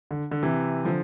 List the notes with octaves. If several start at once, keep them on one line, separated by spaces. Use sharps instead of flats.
D3
D3
C3 E3
D3 F3